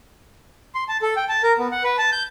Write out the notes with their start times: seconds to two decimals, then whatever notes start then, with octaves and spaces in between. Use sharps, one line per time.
0.75 C6
0.88 A5
1.02 A4
1.16 G5
1.29 A5
1.43 A#4
1.58 B3
1.72 F#5
1.84 B4
1.98 A5
2.12 G6